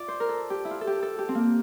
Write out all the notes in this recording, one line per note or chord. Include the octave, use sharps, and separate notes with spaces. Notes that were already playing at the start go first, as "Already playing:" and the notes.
Already playing: F4 D5
C5
A#4
A4
G4
E4
F4
A4
G4
A4
G4
C4
A#3